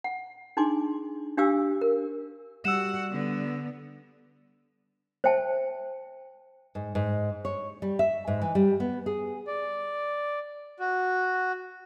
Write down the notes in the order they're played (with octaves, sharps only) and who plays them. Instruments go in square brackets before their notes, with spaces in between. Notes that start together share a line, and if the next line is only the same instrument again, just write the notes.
[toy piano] F#5
D4 D#4 G#4 G#5 C6 D6
D4 G4 F5 G#5 D6 E6
A#4
[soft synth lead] G3 [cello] F#4 F#5 [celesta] E6 E7
[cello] D3 B3
[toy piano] C5 E5 G5 A5
[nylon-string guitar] G#2
G#2
C#5
G3
E5
G#2
E3
G3
B3
G#4
[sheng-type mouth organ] D5
F#4